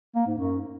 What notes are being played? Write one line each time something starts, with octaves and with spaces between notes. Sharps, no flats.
A#3
G#2
F#2